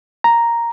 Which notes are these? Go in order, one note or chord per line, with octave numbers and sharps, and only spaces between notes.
A#5